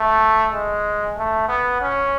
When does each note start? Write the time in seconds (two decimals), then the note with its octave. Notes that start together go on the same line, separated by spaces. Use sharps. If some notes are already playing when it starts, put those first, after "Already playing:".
Already playing: A3
0.52 G#3
1.17 A3
1.49 B3
1.81 C#4